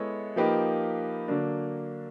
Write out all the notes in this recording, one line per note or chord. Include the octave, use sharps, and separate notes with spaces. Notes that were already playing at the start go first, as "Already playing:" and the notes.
Already playing: G#3 B3 E4 A4 C#5
F3 A#3 D#4 G4 B4
D3 F#3 A#3 D4